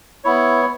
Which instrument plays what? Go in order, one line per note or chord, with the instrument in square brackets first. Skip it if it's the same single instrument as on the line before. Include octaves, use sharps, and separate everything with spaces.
[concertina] B3 E4 C#5